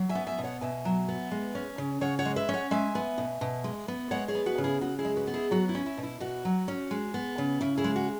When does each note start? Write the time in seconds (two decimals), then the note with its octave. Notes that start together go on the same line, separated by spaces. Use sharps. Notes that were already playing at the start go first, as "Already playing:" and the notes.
Already playing: F#3
0.09 E5 G#5
0.15 B3
0.27 E5 G#5
0.38 B2
0.44 C#5 F#5
0.61 B2 E5 G#5
0.85 F#3
1.08 B3
1.31 G#3
1.55 C#4
1.78 C#3
2.01 C#3 C#5 F#5
2.19 C#5 F#5
2.25 G#3
2.36 B4 E5
2.49 C#4
2.54 C#5 F#5
2.71 G#3 E5 G#5
2.95 B3
3.18 B2
3.41 B2
3.64 G#3
3.88 B3
4.11 G#3 C#5 F#5
4.28 G#4 C#5
4.35 B3
4.46 F#4 B4
4.58 C#3
4.64 E4 G#4
4.81 C#3 F#4
4.99 E4 G#4
5.05 G#3
5.16 F#4 B4
5.27 B3
5.34 E4 G#4
5.51 F#3 F#4
5.69 E4
5.75 C#4
5.86 E4
5.98 B2
6.03 E4
6.20 B2 F#4
6.45 F#3
6.68 C#4
6.91 G#3
7.14 B3
7.38 C#3
7.61 C#3 E4
7.77 E4 G#4
7.84 G#3
7.96 F#4